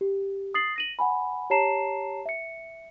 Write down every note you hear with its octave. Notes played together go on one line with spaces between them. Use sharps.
G4
D#6 A6 C7 F#7
A#6 D#7 F#7
F#5 G#5 B5
G4 C#5 A5 A#5 C7 E7
E5 C#7